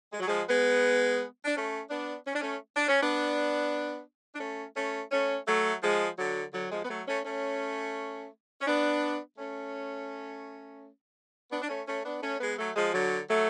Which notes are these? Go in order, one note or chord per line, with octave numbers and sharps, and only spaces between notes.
G#3
F#3
F3 G#3
G#3 B3
D4
A3 C#4
B3 D4
C#4
D4
A3 C#4
D4
C#4
B3 D4
D4
A3 C#4
A3 C#4
A3 C#4
F#3 A3
F3 G#3
D3 F#3
D3 F#3
F3 G#3
B3
F#3 A3
A3 C#4
A3 C#4
C#4
B3 D4
A3 C#4
B3 D4
D4
A3 C#4
A3 C#4
B3 D4
A3 C#4
G#3 B3
F#3 A3
F3 G#3
D3 F#3
F#3 A3